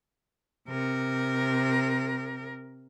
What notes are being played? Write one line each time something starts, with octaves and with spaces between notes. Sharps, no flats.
C3 A#4